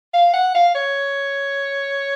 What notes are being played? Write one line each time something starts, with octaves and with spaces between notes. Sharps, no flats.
F5
F#5
F5
C#5